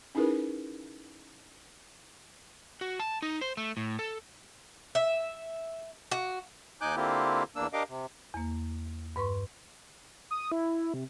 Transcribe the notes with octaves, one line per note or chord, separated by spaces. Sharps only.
C#4 D#4 E4 G#4 A#4 B4
F#4
A5
D#4
C5
A3
A2
A4
E5
F#4
D#2 D#4 G#5 D6 F#6 G6
D3 A#3 C4 E4 F4 G4
E2 A#3 D4 E6
D4 G4 A#4 D#5 F5 D6
C3
E2 A#3
G2 B4 C6 C#6
D#6
E4
C3